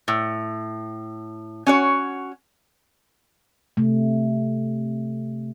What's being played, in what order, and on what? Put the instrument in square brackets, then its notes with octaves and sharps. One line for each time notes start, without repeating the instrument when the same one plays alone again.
[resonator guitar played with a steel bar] A2
C#4 F#4 C#5
[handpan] C3 A3